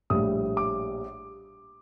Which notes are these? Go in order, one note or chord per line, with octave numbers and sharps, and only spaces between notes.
A#1 A2 G3 D#6
D6